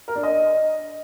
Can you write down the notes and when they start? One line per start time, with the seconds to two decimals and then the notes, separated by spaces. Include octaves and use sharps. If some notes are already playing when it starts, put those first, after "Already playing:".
0.08 A#4
0.16 D4
0.23 D#5